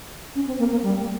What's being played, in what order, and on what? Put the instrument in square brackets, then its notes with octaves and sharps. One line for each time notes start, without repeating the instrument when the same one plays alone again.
[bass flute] C#4
C4
A#3
A#3
G3